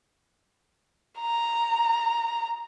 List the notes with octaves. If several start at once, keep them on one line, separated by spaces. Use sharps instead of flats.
A#5